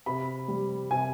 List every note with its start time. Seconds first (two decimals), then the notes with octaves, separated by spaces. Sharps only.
0.06 C3 B5
0.48 G3
0.90 C3 G#5